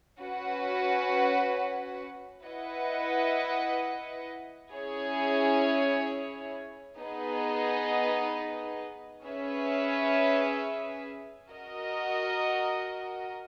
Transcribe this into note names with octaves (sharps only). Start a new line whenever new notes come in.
C#4 F#4 B4 F#5
E4 B4 D#5 F#5
C#4 E4 G#4 C#5
B3 D#4 G#4 B4 D#5
C#4 G#4 B4 E5
F#4 A#4 D#5